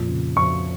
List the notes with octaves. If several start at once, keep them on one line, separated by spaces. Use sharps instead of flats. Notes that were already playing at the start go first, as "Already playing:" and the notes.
Already playing: F2 A#2
C#3
F2 C#6